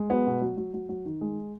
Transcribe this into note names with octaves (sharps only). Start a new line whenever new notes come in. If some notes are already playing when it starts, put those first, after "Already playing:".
Already playing: G#3
F#3 B3
B2
F#3
F#3
F#3
F#3
D#3
G#3